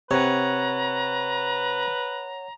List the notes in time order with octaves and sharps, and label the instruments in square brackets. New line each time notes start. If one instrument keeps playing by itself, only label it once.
[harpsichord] C3 [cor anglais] B4 [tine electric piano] C#5 F#5 [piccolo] A#5